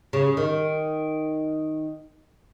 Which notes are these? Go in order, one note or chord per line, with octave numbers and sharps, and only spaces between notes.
C#3
D#3